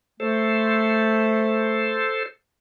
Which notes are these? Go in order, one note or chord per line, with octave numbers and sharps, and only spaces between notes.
A3 A4 C5